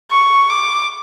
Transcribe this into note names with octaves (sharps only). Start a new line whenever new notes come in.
C#6
D6